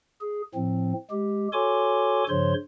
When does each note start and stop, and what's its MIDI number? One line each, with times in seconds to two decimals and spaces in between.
0.21 0.42 68
0.55 0.93 45
0.55 0.93 53
0.55 0.93 60
1.11 1.48 56
1.11 1.48 67
1.53 2.24 66
1.53 2.24 69
1.53 2.24 73
1.53 2.24 80
1.53 2.24 84
1.53 2.24 86
2.29 2.54 43
2.29 2.54 49
2.29 2.54 53
2.29 2.54 72
2.29 2.54 73
2.29 2.54 84